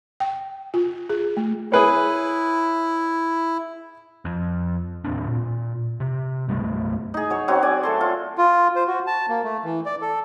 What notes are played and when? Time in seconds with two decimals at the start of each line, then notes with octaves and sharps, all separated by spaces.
0.20 G5
0.74 F4
1.09 G#4
1.37 A3
1.72 E4 G#4 B4 C#5
4.25 F2
5.04 D#2 A2 C4 D4
5.27 A#2
6.00 C3
6.49 C2 G2 G3 A3
7.14 D#4 G#4
7.30 F#3 C#5
7.48 F#3 C4 C#4 F#4
7.62 D5 G#5
7.83 A3 A4 C6
8.01 F4
8.38 F4
8.76 C5
8.87 F#4
9.07 A5
9.29 A#3
9.44 A3
9.64 E3
9.86 D5
10.02 A4